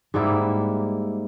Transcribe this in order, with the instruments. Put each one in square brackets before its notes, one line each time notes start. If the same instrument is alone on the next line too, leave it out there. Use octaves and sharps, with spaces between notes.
[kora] G#2 G3 A#3 E4